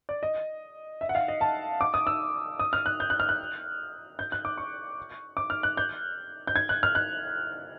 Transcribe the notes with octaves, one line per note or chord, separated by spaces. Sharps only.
D5
D#5
E5
F#5
F5
D#5
A5
D6
D#6
E6
D#6
F6
F#6
G6
F#6
F6
F#6
G6
F#6
D6
C#6
D6
F6
F#6
G6
G6
G#6
F#6
F6
F#6